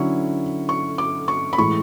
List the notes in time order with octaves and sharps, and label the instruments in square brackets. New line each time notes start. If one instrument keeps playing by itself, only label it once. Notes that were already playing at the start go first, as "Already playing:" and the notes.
Already playing: [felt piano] D3 F#3 C#4 E4 C#6
C#6
D6
C#6
B5
A2 E3 G#3 C#6